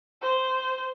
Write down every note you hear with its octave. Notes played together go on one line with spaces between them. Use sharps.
C5